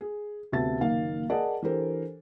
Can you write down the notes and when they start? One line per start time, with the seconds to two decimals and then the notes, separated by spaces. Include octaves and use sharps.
0.01 G#4
0.52 D2 C3 B3 E5 A5 A6
0.80 F#1 D#3 A#3 F5
1.30 G#4 A#4 D5 D#5 F#5 A5
1.62 E3 D4 G4 A4 A#4 C5